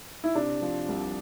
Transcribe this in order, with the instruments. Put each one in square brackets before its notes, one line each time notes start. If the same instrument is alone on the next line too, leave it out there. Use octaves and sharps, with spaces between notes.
[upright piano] E4
C3 D4
F3
C2